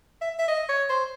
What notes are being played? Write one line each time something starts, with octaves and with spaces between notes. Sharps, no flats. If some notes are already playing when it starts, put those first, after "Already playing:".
E5
E5
D#5
C#5
C5